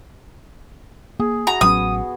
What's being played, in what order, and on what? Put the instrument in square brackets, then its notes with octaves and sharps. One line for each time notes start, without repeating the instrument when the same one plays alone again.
[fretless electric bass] A#3 [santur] G#4
[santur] F#4 [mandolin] A#5
[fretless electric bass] A1 F#3 C#4 [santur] B3 [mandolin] D#6